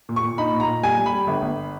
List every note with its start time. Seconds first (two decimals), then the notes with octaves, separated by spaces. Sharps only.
0.09 A#2
0.16 C#6
0.23 A#2
0.38 D#4 B5
0.53 A#2
0.60 A#5
0.67 A#2
0.83 G3 G#5
0.97 G3
1.06 B5
1.13 G3
1.27 G1
1.42 G1